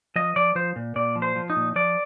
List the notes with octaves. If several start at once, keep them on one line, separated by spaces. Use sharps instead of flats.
F3 D#5
F3 D5
F3 C5
A#2
A#2 D5
F3
C5
F3
D#4
A#2
F3 D5